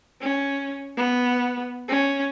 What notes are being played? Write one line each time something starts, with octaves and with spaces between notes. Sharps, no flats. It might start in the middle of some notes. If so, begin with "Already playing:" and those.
C#4
B3
C#4